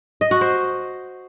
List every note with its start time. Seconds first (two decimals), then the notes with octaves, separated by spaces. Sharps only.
0.21 D#5
0.31 F#4
0.41 C5